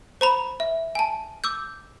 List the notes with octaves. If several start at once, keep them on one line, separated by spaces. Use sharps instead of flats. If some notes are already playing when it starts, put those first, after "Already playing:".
C5 A#5 B5
E5
G#5 A5
D6 E6 G6